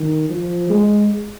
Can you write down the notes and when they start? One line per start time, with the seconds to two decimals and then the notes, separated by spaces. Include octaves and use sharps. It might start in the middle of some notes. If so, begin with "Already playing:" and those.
Already playing: D#3
0.30 F3
0.70 G#3